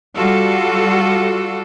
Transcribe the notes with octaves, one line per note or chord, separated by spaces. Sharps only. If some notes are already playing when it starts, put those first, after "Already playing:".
G3 F4 F#4 A4